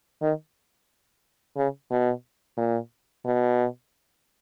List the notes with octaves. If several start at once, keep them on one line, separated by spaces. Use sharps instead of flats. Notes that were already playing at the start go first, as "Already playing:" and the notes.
D#3
C#3
B2
A#2
B2